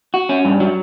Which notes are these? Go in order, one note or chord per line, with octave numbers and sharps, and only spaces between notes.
F#4
C#4
G2
F#3